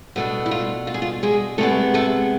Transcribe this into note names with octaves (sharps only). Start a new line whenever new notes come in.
B2 A3 D4
E4
F4
F4
G#4
F4
G#3 G#4
C3 G#3 A3 B3 A4
A3 A4